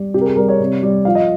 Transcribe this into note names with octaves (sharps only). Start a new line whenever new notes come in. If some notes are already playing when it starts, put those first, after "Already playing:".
Already playing: G3
C3 G4
A#4
G#4
G3 A#4
C#5
C3
G3
F3 F5
D#5